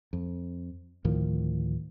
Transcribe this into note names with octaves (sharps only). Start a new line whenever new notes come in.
F2
D2 A2 D#3 F3